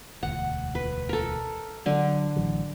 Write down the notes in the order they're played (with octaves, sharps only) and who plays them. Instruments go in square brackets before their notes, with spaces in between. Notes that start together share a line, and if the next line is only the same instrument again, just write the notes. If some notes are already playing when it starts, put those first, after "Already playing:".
[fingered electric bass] E1 D2 [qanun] F#5
[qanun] B4
A4 A#4
[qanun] D3 [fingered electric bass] F#3
[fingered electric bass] A1 E3 F#3